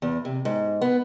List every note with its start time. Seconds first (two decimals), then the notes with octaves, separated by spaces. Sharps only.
0.02 E2
0.25 C3
0.45 G#2
0.81 B3